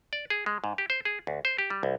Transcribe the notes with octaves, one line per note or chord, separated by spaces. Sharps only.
D5
G#4
G#3
G#2
G4
C5
G#4
D2
C5
G4
G3
C2